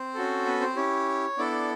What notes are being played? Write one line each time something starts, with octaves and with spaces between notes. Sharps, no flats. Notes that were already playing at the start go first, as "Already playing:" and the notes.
Already playing: C4 C5
C#4 F#4 A4
B3 B4
C4 C5
C#4 E4 G4 C#5
B3 D4 E4 A4 D5